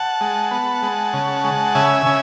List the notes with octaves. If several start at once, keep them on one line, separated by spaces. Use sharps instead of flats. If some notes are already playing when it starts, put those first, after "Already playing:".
Already playing: F#5 A5
G#3
B3
G#3
C#3
G#3
C#3 E5 G#5
C#3